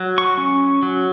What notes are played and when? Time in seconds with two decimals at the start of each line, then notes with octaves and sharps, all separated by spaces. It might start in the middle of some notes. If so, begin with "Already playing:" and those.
Already playing: F#3
0.18 C#6
0.38 C#4
0.83 F#3